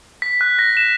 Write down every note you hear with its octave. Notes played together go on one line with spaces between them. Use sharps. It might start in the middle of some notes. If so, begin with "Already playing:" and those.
B6
F#6
A#6
E7